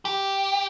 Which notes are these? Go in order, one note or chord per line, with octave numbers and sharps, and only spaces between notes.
G4